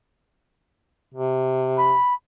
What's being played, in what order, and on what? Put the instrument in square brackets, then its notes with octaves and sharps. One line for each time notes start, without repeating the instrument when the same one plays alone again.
[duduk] C3
[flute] B5